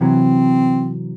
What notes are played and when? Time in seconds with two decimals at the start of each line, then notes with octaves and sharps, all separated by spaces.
0.01 C3 E3 F#3 C4